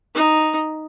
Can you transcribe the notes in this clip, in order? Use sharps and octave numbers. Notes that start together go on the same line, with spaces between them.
D#4